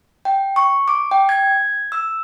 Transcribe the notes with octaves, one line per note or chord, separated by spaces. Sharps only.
G5
C#6
D6
G5
G#6
E6